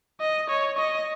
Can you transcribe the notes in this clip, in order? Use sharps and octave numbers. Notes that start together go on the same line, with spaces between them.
D#5
C#5
D#5